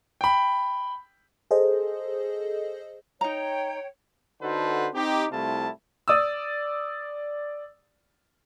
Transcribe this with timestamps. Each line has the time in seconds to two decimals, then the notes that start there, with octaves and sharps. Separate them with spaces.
0.21 G5 B5
1.51 G#4 A4 C5 D#5
3.21 D#4 C#5 G5 A#5
4.42 D3 D#4 F#4 A4 B4 C5
4.94 C4 D#4 G4
5.31 C2 C3 A3 E4 F4 A5
6.08 D5 D#6 E6